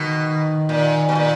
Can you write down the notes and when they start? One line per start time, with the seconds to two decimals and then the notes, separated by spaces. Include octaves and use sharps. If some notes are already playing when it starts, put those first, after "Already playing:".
Already playing: B2 D#3
0.69 A#2
1.09 B2
1.15 A#2